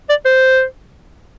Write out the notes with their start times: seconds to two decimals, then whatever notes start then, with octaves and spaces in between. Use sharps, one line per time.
0.09 D5
0.25 C5